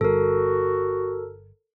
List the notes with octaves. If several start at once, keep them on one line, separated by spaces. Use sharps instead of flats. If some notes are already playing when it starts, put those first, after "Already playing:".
G1 F#4 A4 A#4